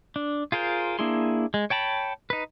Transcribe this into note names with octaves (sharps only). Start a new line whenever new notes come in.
D4
F4 G#4 A#4 C5
A#3 D4 E4 G#4 C6
G#3
C#5 G5 A5 B5
D#4 B4